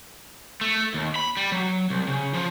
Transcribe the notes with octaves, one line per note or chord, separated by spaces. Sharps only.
A3
D#2
B5
G3
F#3
C2
C#3
F3